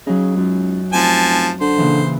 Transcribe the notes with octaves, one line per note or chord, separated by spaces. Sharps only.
C#3 F#3 D#4
C#2 F#2
F1 F3 G#5 A5
D3 C5
A#2 C#3 E3